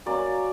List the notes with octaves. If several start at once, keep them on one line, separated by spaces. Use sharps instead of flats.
F#3 A#3 C#4 D5